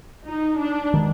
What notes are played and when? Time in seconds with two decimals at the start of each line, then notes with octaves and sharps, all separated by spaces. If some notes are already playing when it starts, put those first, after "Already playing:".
0.26 D#4
0.58 D4
0.94 D#3 G#3